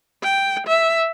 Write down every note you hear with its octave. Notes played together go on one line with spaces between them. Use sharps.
G5
E5